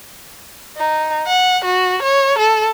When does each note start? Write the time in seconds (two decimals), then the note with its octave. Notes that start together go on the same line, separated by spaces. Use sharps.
0.77 D#4
1.27 F#5
1.64 F#4
2.02 C#5
2.38 A4